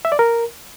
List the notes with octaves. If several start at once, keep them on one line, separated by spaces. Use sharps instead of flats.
E5
D5
A#4